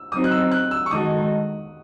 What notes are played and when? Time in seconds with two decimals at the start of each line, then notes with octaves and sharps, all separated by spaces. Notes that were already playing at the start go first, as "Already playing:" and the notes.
Already playing: E6
0.12 F#3 C4 D#4 D#6
0.24 F#6
0.31 E6
0.52 F#6
0.71 E6
0.86 C#6
0.90 D#3 G#3 D#4 F#4 A4 D#6